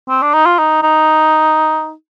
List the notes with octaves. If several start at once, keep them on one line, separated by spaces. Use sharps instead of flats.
C4
D4
D#4
F4
D#4
D#4